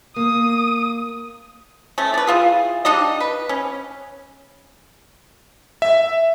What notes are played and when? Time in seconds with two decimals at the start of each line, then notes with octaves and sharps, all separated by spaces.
0.16 A#3 D#6
1.98 A3 C#4
2.14 B4 D5
2.27 E3 F4 G#4
2.85 D4 D#4 G4 D#5
3.20 B4
3.49 C#4
5.82 E5